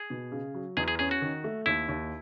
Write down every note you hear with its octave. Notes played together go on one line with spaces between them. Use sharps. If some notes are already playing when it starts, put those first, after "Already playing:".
Already playing: G#4
B2
C#3
F#3
E2 G#4
G#4
C#4 G#4
F#4
D#3
A3
D#2 E4
D#2